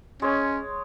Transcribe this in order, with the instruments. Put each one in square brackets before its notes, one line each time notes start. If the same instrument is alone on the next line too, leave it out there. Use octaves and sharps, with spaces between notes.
[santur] G#3 C#5 [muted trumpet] C#4